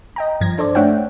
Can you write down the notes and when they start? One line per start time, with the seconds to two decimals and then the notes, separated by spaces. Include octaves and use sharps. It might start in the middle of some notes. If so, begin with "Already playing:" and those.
0.16 D#5 G5 A#5
0.41 G2 F3 G#6 A#6
0.58 D4 A4 C5 D5
0.75 A3 D4 C#5 E5 F#5 G5